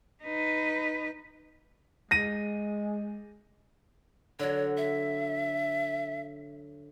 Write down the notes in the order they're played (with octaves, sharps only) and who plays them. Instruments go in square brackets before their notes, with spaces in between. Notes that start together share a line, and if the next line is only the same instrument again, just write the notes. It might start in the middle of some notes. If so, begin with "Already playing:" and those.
[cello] D#4 B4
[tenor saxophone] G#3 [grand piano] A#6 D#7
[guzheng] D3 F#3 [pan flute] C#5
[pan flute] E5